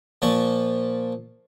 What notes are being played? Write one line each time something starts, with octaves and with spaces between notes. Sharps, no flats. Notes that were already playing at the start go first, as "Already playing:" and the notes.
A#2 F3 A5 C#6